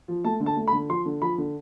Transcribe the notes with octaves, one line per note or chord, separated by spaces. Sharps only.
F3
A3 A5
D3
A5
A3
B5
D3
F3 C6
D3
F3 B5
D3